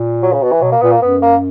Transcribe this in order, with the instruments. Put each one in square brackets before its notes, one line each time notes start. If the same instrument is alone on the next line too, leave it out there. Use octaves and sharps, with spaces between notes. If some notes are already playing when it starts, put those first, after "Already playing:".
Already playing: [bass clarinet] A#2
[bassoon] F#3
C#3
B2
E3
[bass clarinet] B2 [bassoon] F#3
[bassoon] A#3
[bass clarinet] A#2 [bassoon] B3
[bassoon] A#3
[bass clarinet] F#2 [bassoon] B3
[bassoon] A#3